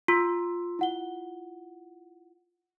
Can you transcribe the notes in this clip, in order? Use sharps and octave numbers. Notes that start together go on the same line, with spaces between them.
F4 C6 E6
E4 F#5 G7